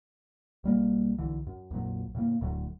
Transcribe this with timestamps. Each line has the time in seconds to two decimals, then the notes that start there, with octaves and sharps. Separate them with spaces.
0.64 B1 G3 A#3
1.18 B1 D3 E3
1.47 F#2
1.71 A#1 F2 A#2 F#3
2.15 A2 C#3 E3 A#3
2.40 D1 D2 A2 F#3